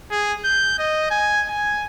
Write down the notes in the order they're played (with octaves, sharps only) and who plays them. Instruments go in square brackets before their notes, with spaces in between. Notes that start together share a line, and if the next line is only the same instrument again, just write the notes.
[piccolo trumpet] G#4
G6
D#5
G#5
G#5